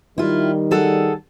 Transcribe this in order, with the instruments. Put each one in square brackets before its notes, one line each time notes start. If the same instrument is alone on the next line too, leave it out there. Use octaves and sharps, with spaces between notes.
[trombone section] D#3 G3 [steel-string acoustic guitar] E4 F4
[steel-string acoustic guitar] G#4 A4 F#5